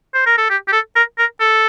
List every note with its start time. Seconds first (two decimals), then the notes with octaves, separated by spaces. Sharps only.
0.14 C5
0.26 A#4
0.38 A4
0.50 G4
0.68 G4
0.72 A4
0.96 A#4
1.19 A#4
1.40 A4